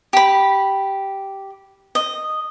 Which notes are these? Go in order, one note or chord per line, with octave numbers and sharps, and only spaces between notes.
G4 B5
D#5